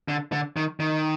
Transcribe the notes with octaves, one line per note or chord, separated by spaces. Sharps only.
D3
D3
D#3
D#3